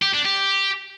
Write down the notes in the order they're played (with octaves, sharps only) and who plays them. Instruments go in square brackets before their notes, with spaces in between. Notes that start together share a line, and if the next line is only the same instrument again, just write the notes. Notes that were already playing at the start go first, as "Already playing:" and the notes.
[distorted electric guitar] G4
D4
G4